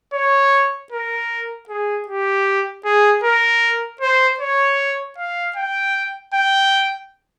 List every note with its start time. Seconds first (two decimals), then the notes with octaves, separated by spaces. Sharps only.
0.14 C#5
0.92 A#4
1.69 G#4
2.08 G4
2.85 G#4
3.24 A#4
4.01 C5
4.40 C#5
5.18 F5
5.56 G5
6.34 G5